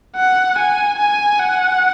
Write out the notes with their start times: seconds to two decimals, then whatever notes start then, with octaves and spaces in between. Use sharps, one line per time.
0.17 F#5
0.59 G#5
0.99 G#5
1.40 F#5